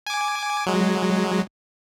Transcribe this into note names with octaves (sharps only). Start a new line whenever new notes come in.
G#5 D6
F#3 G#3